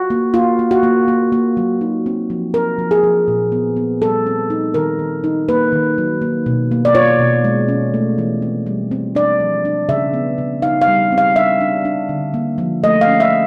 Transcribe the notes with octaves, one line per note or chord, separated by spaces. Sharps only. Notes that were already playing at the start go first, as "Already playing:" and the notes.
Already playing: F4 F#4
A#3
A#3 F4
A#3
F#4
A#3
A#3
A#3
F#3
D#4
C4
F3
C4 A#4
F3
G#4
F3
A#2
B3
B3
G3 A4
C4
D#4
D#3 A#4
D#3
D#4
A#3 B4
D#3
F#3
A#3
B2
A#3
D5
F4 C#5
B2
G#3
C#4
A3
E3
C4
G3
C4
D4 D5
F3
D4
C#3 E5
B3
C#3
D#4 F5
F5
G3
C4
F5
D4 E5
D4
D4
D3
A#3
F3
A3 D#5
F5
C#4
E5